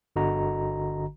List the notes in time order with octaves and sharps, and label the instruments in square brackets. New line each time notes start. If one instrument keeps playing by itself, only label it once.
[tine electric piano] G1 D3 F#4 D#5 A#5